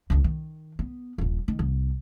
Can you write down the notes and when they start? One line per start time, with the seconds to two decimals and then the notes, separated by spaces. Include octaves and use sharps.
0.10 C#2 D3
0.24 D#3
0.79 B3
1.18 D#1 A#1
1.48 D#3
1.59 C2